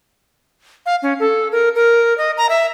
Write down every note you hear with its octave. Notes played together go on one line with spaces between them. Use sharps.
F5
C#4
A4
A#4
A#4
D#5
A#5
E5